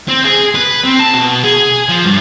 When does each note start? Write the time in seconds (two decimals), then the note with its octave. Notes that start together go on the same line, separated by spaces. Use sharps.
0.08 C4
0.24 G#4
0.55 B4
0.85 C4
1.00 A5
1.14 B2
1.44 G#4
1.89 F3
2.05 G2